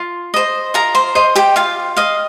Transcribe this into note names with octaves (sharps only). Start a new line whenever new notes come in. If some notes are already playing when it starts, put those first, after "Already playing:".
Already playing: F4
C5 D#5
F4 A#4 A#5
C5 C6
C5 D#5 C6
G4 G5
F4 F5
D#5 F5